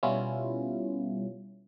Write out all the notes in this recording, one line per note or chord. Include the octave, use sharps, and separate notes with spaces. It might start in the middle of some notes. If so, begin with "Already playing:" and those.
B2 G3 B3 C#4 E4 F4